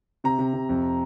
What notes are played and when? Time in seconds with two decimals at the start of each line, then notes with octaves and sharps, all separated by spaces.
0.24 C3 A#5
0.39 C3
0.54 C3
0.69 F2